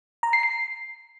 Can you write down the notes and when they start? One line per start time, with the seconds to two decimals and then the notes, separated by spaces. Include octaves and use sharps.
0.23 A#5
0.33 C7
0.43 C7